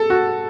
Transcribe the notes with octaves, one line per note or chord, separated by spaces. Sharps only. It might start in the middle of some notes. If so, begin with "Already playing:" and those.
Already playing: A4
F#4